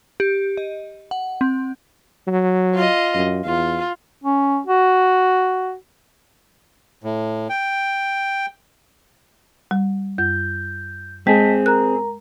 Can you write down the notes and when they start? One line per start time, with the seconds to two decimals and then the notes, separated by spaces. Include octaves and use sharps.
0.20 G4
0.57 D#5
1.11 F#5
1.41 C4
2.27 F#3
2.75 F4 D#5
3.15 F#2
3.45 E2 F4
4.24 C#4
4.67 F#4
7.04 A2
7.49 G5
9.71 G3
10.18 F#2 G6
11.27 G#3 C4 G#4 D#5 A5 B6
11.66 A#4 A#5 F#6